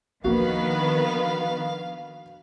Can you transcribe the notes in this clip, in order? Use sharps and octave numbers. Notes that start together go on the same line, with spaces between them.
D#3 F3 A#3 B3 D4 F#4 B4 F5